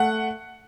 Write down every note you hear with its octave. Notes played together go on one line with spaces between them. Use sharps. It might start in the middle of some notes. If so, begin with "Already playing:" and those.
Already playing: A3 F#5